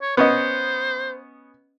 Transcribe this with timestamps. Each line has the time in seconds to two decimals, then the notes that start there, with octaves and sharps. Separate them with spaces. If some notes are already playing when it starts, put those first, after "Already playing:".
0.02 C#5
0.17 B3 C#4 C5 D#5